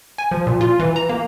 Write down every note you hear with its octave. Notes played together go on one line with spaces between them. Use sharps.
G#5
F3
A#2
F4
E3
A#5
A#3